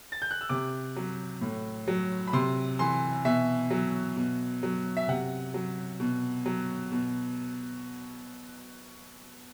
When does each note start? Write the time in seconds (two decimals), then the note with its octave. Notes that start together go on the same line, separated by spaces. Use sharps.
0.12 A6
0.22 G6
0.31 F#6
0.41 E6
0.49 C3 D6
0.96 F#3
1.41 A2
1.88 F#3
2.27 B5
2.33 C3 C6
2.79 E3 C6
3.25 B2 E5
3.71 F#3
4.17 B2
4.63 F#3
4.97 E5
5.08 C3 F#5
5.54 F#3
6.00 B2
6.46 F#3
6.92 B2